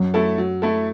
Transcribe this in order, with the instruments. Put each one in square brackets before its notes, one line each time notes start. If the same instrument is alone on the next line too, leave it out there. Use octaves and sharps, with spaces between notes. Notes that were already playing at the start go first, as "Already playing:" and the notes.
Already playing: [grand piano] F#2
[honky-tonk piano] A3 E4 A4
F#3
A3 E4 A4